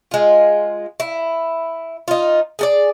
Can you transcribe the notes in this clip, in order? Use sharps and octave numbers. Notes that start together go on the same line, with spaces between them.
G#3 F4
E4
D#4 F4
G#4 A4 D5